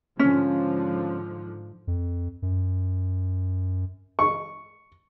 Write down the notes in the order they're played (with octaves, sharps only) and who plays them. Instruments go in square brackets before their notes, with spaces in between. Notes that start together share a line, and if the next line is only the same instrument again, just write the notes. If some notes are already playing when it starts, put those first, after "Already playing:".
[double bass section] G#2 D3 F3 [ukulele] C#4
[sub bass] F2
F#2
[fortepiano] C#6